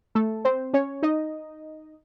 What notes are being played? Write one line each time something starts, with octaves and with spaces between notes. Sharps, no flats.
A3 A4
C4 C5
C#4 C#5
D#4 D#5